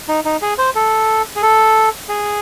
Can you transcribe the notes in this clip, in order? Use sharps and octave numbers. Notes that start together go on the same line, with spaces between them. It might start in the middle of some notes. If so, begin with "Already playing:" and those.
D#4
D#4
G#4
C5
A4
G#4
A4
G#4